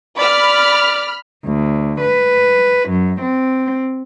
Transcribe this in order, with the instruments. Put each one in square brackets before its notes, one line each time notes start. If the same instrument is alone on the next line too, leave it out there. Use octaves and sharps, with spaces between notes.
[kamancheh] D5 [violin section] B5 F6
[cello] D2
B4
F#2
C4